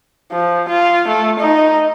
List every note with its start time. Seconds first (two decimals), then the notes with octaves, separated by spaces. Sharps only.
0.31 F3
0.69 F4
1.08 A3
1.39 D#4